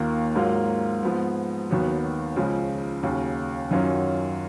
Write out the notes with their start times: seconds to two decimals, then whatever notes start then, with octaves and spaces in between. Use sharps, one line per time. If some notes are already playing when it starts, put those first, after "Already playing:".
Already playing: D#2 D#3 A#3 F4
0.36 G#2 F#3 A#3 F4
1.03 G#2 F3 B3
1.70 D#2 D#3 F#3 B3 F#4
2.36 C#2 C#3 F3
3.03 D#2 C#3 F#3
3.71 F#2 D#3 F#3 C#4 F4